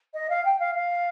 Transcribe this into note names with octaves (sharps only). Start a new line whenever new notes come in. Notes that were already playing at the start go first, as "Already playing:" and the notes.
D#5
F5
G5
F5
F5